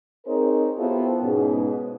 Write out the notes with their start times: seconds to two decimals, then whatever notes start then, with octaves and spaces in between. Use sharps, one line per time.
0.25 C4 D#4 G#4 A#4 C5 C#5
0.77 B3 E4 F4 G4 A4 C5
1.21 G#2 B2 G#3 C#4